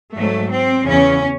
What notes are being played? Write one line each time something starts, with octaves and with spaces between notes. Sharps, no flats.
G#2 F#3 A3
C4
E2 C#3 E3 C#4